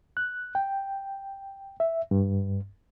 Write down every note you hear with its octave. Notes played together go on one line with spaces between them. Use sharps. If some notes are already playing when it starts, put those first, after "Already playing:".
F#6
G5
E5
G2